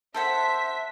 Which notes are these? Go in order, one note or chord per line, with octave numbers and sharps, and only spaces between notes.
A4 C5 E5 F#5 B6